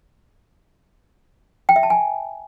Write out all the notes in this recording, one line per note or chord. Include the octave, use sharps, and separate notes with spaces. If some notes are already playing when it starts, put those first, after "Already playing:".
G5
E5
A5
G#5